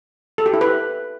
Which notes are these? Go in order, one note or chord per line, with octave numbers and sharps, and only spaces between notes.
A4
G4
E4
B4